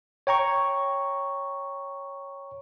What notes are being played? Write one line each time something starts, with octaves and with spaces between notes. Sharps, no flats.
C#5 G5 A#5 C#6